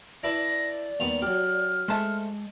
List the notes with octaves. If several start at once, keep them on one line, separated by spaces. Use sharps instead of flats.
D4 E4 B4 D5 A#6
D#2 G3 B3 F7
F#3 G4 F6
G#3 A3 C5 A5